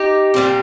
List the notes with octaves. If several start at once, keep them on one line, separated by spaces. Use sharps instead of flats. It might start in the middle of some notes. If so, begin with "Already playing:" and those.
Already playing: D#4 G4
A#2 G3 C4